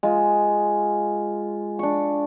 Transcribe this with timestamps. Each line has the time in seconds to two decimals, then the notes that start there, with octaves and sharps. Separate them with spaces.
0.03 G#3 F4
1.79 D4 C#6